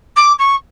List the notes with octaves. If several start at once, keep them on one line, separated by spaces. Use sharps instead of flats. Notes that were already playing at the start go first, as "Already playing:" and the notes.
D6
C#6